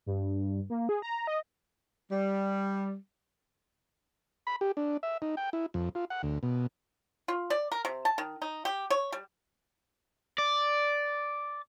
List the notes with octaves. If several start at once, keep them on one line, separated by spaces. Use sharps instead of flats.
G2
A#3
G#4
A#5
D#5
G3
B5
G4
D4
E5
D#4
G5
E4
F2
F4
F#5
D2
B2
F4
D5
A#4
C3
A5
D#3
D#4
G4
C#5
G3
D5